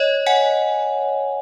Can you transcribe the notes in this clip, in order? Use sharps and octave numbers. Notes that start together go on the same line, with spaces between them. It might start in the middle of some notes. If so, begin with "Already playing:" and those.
Already playing: C#5 D#5
F#5 G#5